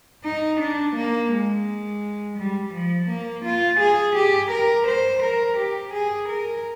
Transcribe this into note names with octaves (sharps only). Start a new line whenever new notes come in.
D#4
D4
A#3
G#3
G3
F3
A#3
F4
G#4
G4
A#4
C5
A#4
G4
G#4
A#4